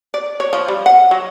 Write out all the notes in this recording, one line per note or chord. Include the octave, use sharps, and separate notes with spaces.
D5
C#5
F3
G3
F#5
F#3